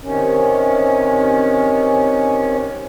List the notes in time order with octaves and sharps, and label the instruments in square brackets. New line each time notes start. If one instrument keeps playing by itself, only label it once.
[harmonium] C3 D#3 C#4